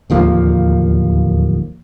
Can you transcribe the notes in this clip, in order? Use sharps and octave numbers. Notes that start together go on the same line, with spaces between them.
D1 D#2 F3 A#3